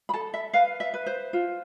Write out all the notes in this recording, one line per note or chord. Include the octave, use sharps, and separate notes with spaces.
B5
A4 A5
E5
B4 F5
E5
B4
C5
F4